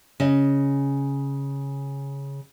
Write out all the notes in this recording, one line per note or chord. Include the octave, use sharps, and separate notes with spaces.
C#3 D#5